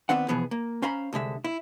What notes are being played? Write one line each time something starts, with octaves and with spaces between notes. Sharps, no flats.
D#3 B3 C4 D4 F#5
B2 E3 F3 B3 G#4
A#3
C#4 C5 F5 A#5 B5
C2 D3 G#3 E5
E4